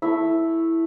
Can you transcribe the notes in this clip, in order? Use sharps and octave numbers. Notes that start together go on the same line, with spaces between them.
A3 E4 E5